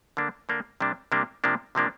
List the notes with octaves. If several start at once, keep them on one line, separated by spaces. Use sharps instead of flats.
D3 A#3 D4
D3 A#3 D4
C3 G3 A#3 D4
C3 G3 A#3 D4
C3 F3 A#3 D4
C3 F3 A#3 D4